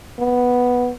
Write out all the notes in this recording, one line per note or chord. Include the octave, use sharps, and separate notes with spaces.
B3